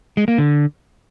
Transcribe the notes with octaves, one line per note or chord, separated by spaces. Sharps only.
G#3
A#3
D3